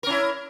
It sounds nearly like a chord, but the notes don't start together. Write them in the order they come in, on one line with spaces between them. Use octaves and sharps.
A#4 C#4 E4